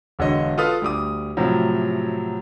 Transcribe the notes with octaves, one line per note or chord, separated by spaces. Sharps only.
E1 D3 C#5 D#5
F4 A4 B4 D#6 F6
D2 G3 D6 D#6
A2 C3 F3 F#3